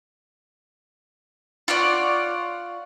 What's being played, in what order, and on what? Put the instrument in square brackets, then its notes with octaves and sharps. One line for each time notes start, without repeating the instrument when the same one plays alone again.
[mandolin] F4 C#5 D5 F#5